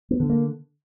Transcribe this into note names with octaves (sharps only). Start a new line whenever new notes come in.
B3
D3
A#3